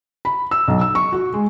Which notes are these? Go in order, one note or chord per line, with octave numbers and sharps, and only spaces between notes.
B5
E6
B1
E6
C#6
F#4
G#3